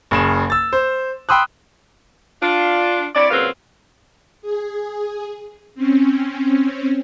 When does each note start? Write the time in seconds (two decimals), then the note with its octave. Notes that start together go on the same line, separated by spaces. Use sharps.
0.11 F#1 C#3 E7
0.50 E6 A6
0.73 C5
1.29 G5 B5 C6 D#6 E6 F#6
2.41 D4 F4
3.14 C4 E4 C#5 D5
3.30 A#2 C#3 F#3 C4 B4 F5
4.42 G#4
5.75 C4 C#4